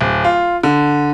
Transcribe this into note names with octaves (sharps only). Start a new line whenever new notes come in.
D1
F4
D3